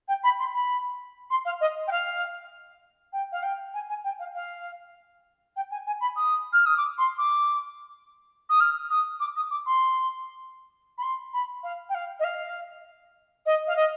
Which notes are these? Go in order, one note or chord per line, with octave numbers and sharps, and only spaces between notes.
G5
B5
C6
B5
C6
F5
D#5
G5
F5
G5
F5
G5
G#5
G#5
G5
F5
F5
G5
G#5
G#5
B5
D#6
F6
D#6
D6
C6
D6
D#6
F6
D#6
D6
D#6
D6
C6
B5
C6
B5
F5
G5
F5
D#5
F5
D#5
F5
D#5